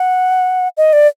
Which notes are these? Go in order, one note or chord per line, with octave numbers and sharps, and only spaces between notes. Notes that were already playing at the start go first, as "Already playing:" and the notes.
Already playing: F#5
D#5
D5